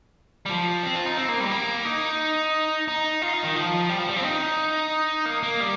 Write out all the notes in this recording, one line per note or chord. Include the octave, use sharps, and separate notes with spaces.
G3
F3
C4
F4
D#4
C4
A#3
G3
A#3
D#4
D#4
F4
D#4
D#3
F3
G3
F3
G3
C4
D#4
A#3
A#3
G3